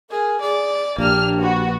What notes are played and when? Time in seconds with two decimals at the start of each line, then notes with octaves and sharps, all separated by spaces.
0.10 G#4 A#4
0.41 G#4 D5
0.98 A#1 A#3 D4 G4 F6
1.39 B3 F#4